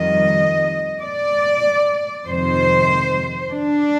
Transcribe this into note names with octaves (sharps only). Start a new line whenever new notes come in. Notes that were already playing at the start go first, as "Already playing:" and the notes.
Already playing: F2 D#3 G3 D#5
D5
F2 C3 D#3 C5
D4